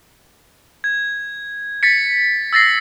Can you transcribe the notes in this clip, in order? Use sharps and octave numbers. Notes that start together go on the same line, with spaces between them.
G#6
A6 B6 C#7
E6 A6 A#6 C7